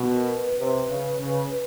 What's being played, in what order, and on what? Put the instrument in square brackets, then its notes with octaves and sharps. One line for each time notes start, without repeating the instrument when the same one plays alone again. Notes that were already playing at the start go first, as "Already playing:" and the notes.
Already playing: [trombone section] B2
[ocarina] A#4
B4
[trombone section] C3 [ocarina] B4
[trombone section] C#3
C#3